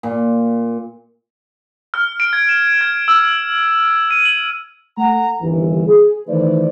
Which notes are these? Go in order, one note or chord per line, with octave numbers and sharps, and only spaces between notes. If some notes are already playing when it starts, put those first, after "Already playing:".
A#2
F6
D7
G#6
E7
G#6
E6
D#7
F#7
A3 F#5 A#5
G1 D#2 E3
G#4
D#3 E3 A3 B4 C5 D5